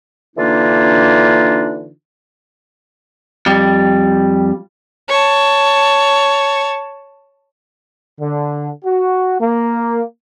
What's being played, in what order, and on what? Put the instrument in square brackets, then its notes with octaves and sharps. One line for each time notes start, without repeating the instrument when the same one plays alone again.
[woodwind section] D3 E3 A#3 D4 D#4 F4
[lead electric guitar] F2 G3
[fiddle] C#5 A5
[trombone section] D3
F#4
A#3